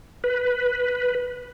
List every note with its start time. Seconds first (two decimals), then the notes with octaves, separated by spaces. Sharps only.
0.24 B4